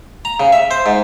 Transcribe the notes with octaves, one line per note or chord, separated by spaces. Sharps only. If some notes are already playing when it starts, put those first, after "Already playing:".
A#5
C#3
E5
C5
G#2